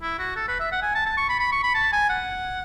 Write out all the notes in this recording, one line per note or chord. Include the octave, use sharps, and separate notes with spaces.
E4
F#4
A4
B4
E5
F#5
G#5
A5
A5
C#6
B5
B5
C#6
B5
A5
G#5
F#5